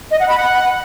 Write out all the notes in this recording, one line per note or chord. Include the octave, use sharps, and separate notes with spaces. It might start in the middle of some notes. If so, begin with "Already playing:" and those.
D#5
F#5
B5
F#5